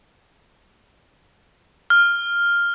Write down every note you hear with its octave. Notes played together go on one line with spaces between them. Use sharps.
F6